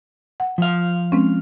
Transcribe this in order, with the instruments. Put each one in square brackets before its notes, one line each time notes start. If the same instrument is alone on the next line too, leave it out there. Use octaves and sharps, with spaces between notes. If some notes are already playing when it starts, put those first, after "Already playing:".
[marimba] F#5
[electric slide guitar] F3 F5
[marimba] G#3 C4 C#4